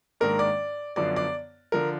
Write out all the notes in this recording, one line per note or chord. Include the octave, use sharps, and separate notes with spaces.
G#2 D#3 A#3 D4 A#4
D5
F#2 D3 F3 B3 D5
D5
D3 F3 A#4